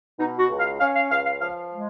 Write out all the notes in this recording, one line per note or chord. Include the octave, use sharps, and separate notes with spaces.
B2 D#4
F#4
C#2
F5
C#4 F5
F5
C#2 F5
F5
F3 F5
G#3